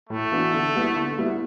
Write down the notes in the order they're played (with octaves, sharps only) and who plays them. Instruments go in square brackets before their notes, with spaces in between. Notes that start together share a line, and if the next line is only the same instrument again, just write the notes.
[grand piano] A2 [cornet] A3
[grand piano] E3 B3 D4 F#4
D3
G3 B3 E4
D3
G3 B3 E4